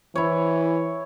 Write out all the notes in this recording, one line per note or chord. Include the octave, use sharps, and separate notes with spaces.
E3 E4 C#5